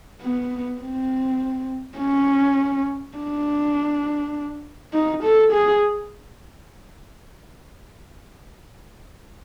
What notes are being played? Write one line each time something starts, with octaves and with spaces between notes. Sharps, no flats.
B3
C4
C#4
D4
D#4
A4
G#4